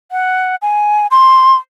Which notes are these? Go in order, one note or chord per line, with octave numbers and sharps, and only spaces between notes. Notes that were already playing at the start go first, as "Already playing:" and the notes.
F#5
G#5
C6